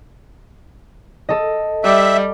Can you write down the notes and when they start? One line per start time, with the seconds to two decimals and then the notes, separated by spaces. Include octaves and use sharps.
1.29 A4 D#5
1.84 G3 E5